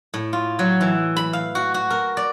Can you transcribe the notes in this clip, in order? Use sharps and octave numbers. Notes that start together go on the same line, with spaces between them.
A2
F4
F#3
E3
B5
F5
F#4
F#4
A#4
D5